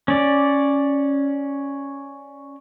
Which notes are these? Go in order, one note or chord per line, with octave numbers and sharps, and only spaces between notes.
C#4 D5